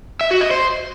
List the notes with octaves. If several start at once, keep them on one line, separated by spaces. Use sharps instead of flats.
E5
F#4
D#5
C5